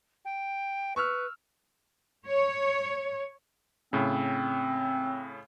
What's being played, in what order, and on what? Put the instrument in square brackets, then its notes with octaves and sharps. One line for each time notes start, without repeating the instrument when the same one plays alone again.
[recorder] G5
[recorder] B4 [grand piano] C#6 E6 F6
[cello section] C#5
[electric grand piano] A2 C#3 [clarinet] C4